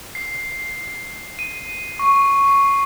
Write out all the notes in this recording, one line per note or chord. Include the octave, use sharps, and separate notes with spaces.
C7
C7
D#7
C#6
C7